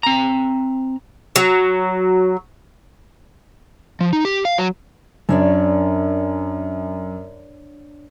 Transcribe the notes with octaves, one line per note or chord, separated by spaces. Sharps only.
C4 A#5
F#3
F3
D#4
G4
F5
F#3
F#2 D4 C#5 D5